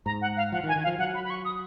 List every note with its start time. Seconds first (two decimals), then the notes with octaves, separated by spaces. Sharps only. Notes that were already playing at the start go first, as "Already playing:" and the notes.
0.06 G#2 A#5
0.21 F#5
0.37 F5
0.52 F3 F#5
0.64 D#3
0.68 G#5
0.76 D#3
0.83 F5
0.87 F3
0.99 F#3 F#5
1.14 B5
1.24 B5
1.30 C#6
1.45 D#6